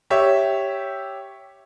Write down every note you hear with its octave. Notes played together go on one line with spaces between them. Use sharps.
G4 C#5 E5